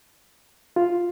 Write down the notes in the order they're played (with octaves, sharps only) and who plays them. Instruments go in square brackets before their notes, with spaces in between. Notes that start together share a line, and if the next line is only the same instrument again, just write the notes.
[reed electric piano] F4